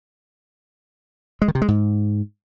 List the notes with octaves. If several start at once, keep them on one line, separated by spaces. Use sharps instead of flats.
G#3
D#3
C3
G#3
G#2